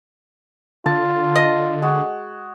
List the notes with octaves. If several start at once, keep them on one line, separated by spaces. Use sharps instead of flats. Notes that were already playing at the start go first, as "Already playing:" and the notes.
D3 F4 A5
D#5
G#3 F#4